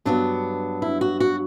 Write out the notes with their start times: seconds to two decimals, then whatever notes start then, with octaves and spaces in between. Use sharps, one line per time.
0.05 G2 F#3 B3 D4
0.82 E4
1.01 F#4
1.20 F#4